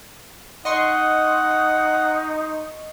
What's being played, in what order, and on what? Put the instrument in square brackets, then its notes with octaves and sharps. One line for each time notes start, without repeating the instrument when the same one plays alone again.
[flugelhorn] D#4 [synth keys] D#5 C6 C#6 [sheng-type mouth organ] F#5